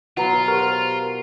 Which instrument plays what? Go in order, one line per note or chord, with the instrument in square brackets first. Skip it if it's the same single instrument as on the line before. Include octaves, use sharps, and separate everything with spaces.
[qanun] B2 F#3 B4 [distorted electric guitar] F4 [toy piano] F#5 A#5
[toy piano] G4 C5 [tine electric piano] A#4